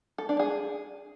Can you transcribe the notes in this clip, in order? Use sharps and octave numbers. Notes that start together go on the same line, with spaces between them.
A4
D4
G#4